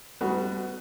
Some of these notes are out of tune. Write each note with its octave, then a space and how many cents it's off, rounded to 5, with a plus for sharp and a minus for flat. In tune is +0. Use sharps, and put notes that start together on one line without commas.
G3 -10 B3 +30 F#4 +5